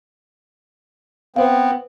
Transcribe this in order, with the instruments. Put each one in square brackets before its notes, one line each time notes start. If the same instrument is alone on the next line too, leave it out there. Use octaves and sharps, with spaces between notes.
[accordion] B3 C4 [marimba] B4 C5 F5